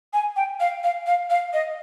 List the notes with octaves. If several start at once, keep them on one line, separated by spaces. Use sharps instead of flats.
G#5
G5
F5
F5
F5
F5
D#5